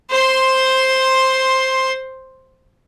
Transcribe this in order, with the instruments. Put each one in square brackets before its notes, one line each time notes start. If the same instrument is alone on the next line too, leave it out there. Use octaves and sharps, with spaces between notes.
[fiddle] C5 C6